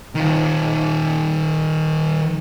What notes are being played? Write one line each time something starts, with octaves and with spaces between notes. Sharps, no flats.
D#3 F4